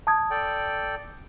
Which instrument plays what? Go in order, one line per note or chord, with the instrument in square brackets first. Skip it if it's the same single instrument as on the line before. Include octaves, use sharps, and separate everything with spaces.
[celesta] A5 D#6 G#6
[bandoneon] A4 D5 G5